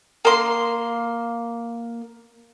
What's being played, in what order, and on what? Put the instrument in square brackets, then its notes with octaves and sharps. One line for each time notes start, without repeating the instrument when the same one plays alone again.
[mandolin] A#3 C6